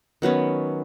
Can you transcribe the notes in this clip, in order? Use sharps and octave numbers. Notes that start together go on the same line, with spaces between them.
D#3 F#3 B3 C#4